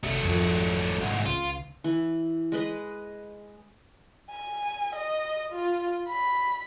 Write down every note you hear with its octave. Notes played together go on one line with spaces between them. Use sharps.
F#1 C3 F#3 A3
G#1 F2
C2 G#2
C#2 F4
E3
G#3 B4 D#5
G#5
D#5
F4
B5